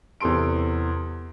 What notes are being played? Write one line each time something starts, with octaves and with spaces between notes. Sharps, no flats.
E2 C3 A4 C6 D7